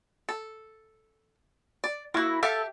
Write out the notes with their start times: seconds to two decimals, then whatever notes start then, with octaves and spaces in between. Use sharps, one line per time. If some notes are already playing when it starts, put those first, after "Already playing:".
0.29 A4
1.84 D5
2.14 A#3 E4 F#4
2.43 G4 A4 E5 F5